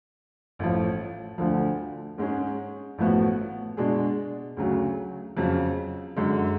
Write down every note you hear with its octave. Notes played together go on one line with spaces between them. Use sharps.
A1 A2 F3
D2 D3 F3
G#2 G#3 C#4 G#4
A1 A2 F3 B3 F#4
B2 G#3 D4 G#4
D2 C#3 F#3
F2 C#3 F#3
F#2 D3 G#3